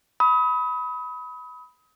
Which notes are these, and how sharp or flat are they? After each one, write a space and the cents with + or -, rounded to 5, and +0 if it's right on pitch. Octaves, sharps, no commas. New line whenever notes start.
B5 +0 D#6 +35